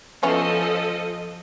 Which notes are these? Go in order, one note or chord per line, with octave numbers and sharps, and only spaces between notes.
F3 B3 C#4 E4 A4 D#5